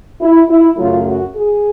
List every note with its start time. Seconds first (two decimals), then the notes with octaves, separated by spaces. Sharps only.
0.21 E4
0.49 E4
0.78 F#2 C#3 F#3 A3 F4
1.06 F#4
1.34 G#4